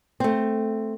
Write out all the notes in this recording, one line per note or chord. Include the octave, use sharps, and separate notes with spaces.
A3 C4